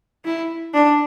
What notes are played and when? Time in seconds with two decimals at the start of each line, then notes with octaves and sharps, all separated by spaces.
0.25 E4
0.74 D4